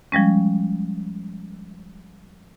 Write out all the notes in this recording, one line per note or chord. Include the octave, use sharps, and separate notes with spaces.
F3 G3 G#3 C#4